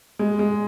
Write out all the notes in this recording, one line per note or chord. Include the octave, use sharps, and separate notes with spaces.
G#3
G#3